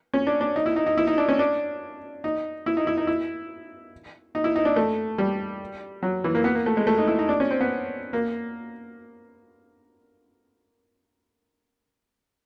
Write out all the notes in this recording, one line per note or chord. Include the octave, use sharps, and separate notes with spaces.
C#4
D4
D4
D#4
E4
D#4
D#4
E4
D#4
D4
C#4
D4
D#4
E4
D#4
E4
D#4
E4
D#4
E4
D#4
D4
A3
G3
F#3
E3
A#3
B3
A#3
A3
G#3
A3
D#4
E4
D#4
D4
C#4
C4
B3
A#3